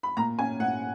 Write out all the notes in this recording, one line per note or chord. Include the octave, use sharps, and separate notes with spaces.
B5
A#2 A#5
C#4 G#5
A#2 F#5